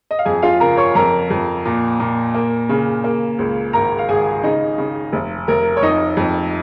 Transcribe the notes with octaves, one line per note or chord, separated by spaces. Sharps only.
D#5
F5
F2 G#4 G#5
F4 F5
C#3 A#4 A#5
C#5 C#6
F2 A#4 A#5
F2
A#2
A#2
A#3
C#3
A#3
C#2
G#1 A#4 A#5
F5
G#1 G#4 G#5
C#3 D#4 D#5
C#3
F1
F1 A#4
C#5
F2 D#4 D#5
F2